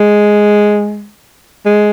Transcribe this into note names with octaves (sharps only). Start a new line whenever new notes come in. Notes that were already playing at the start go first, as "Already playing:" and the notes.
Already playing: G#3
G#3